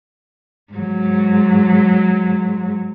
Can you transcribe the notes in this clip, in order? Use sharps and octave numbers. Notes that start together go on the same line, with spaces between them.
G#2 F#3